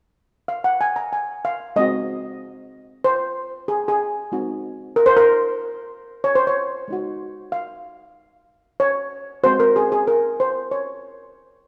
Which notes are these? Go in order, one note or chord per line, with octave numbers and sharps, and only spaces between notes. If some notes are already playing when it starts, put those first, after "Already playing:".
F5
F#5
G#5
A#5
G#5
F5
G#3 C4 F#4 D#5
C5
G#4
G#4
G#3 C4 D#4 F#4
A#4
C5
A#4
C#5
C5
C#5
G#3 D#4 F#4
F5
C#5
G#3 C4 F#4 C5
A#4
G#4
G#4
A#4
C5
C#5